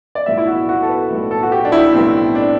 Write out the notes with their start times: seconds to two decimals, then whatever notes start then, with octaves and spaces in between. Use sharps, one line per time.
0.15 D5
0.26 B1 A2 G3 B3 E5
0.38 E4
0.47 F#4
0.69 F#4
0.82 A4
0.88 B4
1.10 B1 A2 G3 B3
1.31 A4
1.43 F#4
1.52 G4
1.65 D4
1.72 E4
1.93 B1 A2 G3 B3 C4
2.35 D4